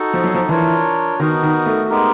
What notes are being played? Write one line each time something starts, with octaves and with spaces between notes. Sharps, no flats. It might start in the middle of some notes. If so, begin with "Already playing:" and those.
Already playing: D#4 F#4 A4
F3
F#3
F3
E3 D4 F4 A#4 C#5
D#3 B3 D#4 F#4 A#4
D#3
A3
G#3 B3 D#4 G4 A#4